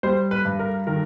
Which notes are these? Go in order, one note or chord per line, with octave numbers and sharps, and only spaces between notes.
G3 C5
B4
G2
A#4
D#3 A#4